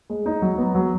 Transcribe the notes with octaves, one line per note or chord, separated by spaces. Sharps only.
G#3
D#4
F#3
B3
F#3